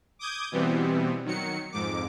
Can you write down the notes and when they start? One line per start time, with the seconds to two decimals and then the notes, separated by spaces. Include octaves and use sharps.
0.19 D6 D#6 G6 G#6
0.52 B2 E3 G3 B3 C4
1.25 D#3 F#3 C#7
1.72 F2 G#2 D6